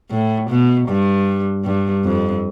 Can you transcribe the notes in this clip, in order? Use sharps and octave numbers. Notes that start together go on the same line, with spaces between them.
A2
B2
G2
G2
F2